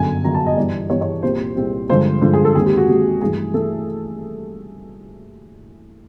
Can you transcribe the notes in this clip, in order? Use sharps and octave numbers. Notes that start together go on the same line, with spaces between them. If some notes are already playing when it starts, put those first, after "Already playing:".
Already playing: G1 F#2 D3 G#5
G1 F#2 D3 A#5
A5
D#5
G2 E3 G3 B3 D5
G2 E3 G3 B3 C#5
C#5
C2 A#2 G3 C4 C5
C2 A#2 G3 C4
G2 D3 F3 G#3 C5
G2 D3 F3 G#3
G#4
A4
D#2 D#3 G#3 C4 G#4
G4
F#4
D#2 D#3 G#3 C4 G4
G2 E3 A3 G#4
E3 A3 A4